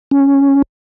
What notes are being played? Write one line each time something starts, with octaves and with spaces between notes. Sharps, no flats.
C#4